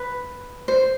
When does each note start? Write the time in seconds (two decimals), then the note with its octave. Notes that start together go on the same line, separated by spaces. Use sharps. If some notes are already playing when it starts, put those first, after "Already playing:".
Already playing: B4
0.68 C5